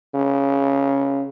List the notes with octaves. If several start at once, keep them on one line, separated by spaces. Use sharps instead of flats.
C#3